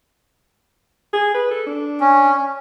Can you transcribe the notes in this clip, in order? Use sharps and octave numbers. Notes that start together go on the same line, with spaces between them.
G#4
B4
A4
D4
C#4